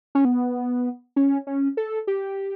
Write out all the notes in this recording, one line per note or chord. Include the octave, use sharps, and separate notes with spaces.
C#4
B3
C#4
C#4
A4
G4